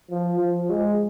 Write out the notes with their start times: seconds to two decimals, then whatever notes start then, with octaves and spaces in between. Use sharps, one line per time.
0.11 F3
0.40 F3
0.70 G#3